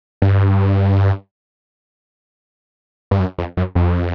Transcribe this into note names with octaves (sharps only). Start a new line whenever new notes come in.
G2
G2
F#2
F2
F#2
F2